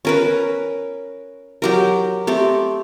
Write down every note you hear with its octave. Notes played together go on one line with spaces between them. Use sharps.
C#4 A#4 B4
F#3 G4 A#4
A3 C4 G4